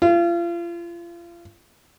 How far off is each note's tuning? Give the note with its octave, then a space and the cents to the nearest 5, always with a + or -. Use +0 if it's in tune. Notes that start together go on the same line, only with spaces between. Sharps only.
F4 -35